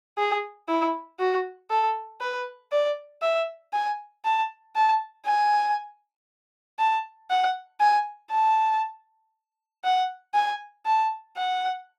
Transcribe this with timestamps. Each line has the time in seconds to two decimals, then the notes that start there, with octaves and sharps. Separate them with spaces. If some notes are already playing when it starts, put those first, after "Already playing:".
0.18 G#4
0.68 E4
1.19 F#4
1.70 A4
2.20 B4
2.72 D5
3.22 E5
3.73 G#5
4.25 A5
4.75 A5
5.26 G#5
6.79 A5
7.30 F#5
7.80 G#5
8.31 A5
9.84 F#5
10.34 G#5
10.86 A5
11.36 F#5